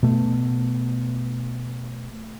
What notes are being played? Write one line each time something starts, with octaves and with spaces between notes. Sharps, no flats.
B2 A3